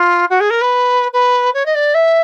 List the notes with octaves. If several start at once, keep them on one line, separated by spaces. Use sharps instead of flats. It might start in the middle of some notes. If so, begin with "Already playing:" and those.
Already playing: F4
F#4
G#4
A#4
B4
B4
C#5
D#5
D5
E5